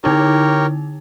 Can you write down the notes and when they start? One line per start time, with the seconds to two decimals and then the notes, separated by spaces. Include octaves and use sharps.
0.04 D3 D#4 E4 G4 A#4 C#5